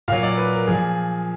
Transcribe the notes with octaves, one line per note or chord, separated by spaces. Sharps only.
A#2 F#3 F5
D5
B4
A#4
A#2 F3 G#4